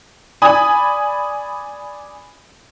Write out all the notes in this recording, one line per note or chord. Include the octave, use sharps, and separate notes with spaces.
D5 G#5 B5 D#6